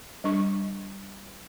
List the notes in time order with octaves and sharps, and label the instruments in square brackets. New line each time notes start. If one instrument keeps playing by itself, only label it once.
[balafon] G3 D4 C#6